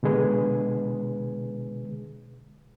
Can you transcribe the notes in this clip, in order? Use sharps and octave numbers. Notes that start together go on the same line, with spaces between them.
B2 D3 G#3 G#4 B4